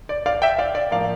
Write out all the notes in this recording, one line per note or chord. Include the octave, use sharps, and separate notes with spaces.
D5
D5 F5
E5 G5
D5 F5
D5
A2 F3 A#3 D5 F5